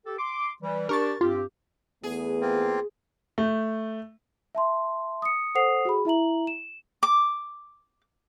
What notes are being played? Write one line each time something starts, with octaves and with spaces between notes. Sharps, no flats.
G4 A4
C6 D6
E3 G3
D4 G4 A#4 C#6 A6
G2 C4 F4 G4
E2 A3 B3 G#4
A#3 C4 F4
A3
E5 A5 C6
D#6 C#7
A4 C5 F#5 D#6 C7 F7
F#4 G#4 B5
E4 E5 A#5 F#7
E7
D6